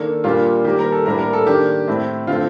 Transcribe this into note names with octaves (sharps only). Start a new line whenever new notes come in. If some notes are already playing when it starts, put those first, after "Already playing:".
Already playing: D#3 A#3 D4 A4
A#2 G3 A#3 D4 F4
D#3 G3 A#3 G4
A#4
A4
A2 G3 A#3 D4 A#4
A#4
A4
D#3 A#3 D4 G4
A2 A3 C4
D3 A3 C4 F4